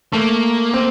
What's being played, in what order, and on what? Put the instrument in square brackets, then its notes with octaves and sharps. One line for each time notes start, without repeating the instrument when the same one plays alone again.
[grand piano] A3 [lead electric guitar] A#3
[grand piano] C4